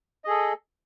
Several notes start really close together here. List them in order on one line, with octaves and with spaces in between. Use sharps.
D#5 G#4 A4